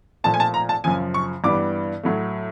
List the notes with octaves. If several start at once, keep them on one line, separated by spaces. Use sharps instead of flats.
A#2 F3 A3 A5
G#5
A5
A#5
A5
F#2 C#3 F3 G#5
C#6
G2 E3 G3 B3 D6
A2 F#3 A3